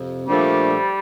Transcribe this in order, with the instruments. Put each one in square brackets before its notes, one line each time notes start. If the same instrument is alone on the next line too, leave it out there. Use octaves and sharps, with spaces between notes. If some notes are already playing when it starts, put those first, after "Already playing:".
Already playing: [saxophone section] F2 C3
[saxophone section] A#2 F3 A3 D4 A4 [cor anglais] G3